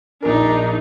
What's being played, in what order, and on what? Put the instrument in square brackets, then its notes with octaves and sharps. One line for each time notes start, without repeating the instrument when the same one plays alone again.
[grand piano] A#1 A#4 [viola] D4 D#4